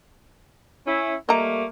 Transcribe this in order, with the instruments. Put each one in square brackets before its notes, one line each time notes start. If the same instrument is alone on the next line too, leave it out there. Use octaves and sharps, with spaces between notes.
[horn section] C#4 E4
[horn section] G3 A3 A#3 [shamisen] D#5 A#5